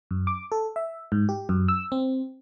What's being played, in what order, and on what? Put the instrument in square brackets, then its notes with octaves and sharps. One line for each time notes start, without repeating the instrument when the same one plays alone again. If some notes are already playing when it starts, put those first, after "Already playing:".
[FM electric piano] F#2
D6
A4
E5
G#2
G4
F#2
E6
C4